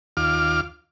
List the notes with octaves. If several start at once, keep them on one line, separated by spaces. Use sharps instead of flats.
D#2 F4 D6 F6